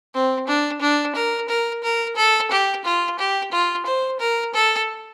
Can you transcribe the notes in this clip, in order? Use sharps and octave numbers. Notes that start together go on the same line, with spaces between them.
C4
D4
D4
A#4
A#4
A#4
A4
G4
F4
G4
F4
C5
A#4
A4